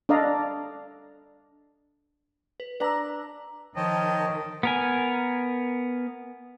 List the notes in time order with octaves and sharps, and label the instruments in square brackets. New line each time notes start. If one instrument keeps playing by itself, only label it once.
[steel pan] D4 A4 D5 D#5 F5 A#5
[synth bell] B4
[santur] D4 A#5 [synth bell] B4 E6
[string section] D#3 [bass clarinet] F3 [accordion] C#5 G5 A5 [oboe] D#5
[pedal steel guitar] B3 A#4 G#5